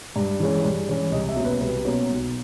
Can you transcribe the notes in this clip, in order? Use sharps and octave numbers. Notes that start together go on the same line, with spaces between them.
G2
E3 G#3 C#4
G2
E3 G#3 C#4
C2 D#5
E5
B2 F#3 A#3 C#4
B4
C2 B4
B2 F#3 A#3 C#4
B1